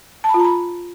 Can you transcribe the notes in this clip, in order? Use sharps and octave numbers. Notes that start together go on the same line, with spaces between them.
A5
B5
F4
A#5
B5